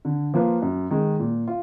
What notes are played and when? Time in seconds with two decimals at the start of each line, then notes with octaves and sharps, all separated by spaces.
0.05 D3
0.34 F3 A#3 F4 B4
0.62 F#2
0.90 D#3 G#3
1.19 A#2
1.47 F4